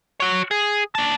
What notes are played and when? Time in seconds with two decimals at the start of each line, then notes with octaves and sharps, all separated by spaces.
0.20 F#4 C#5
0.51 G#4
0.95 A#3 A5